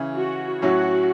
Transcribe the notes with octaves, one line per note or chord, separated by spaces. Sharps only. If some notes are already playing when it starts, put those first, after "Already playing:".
Already playing: C#3 E3 C#4 E4
F#4
A2 F#3 C#4 E4 F#4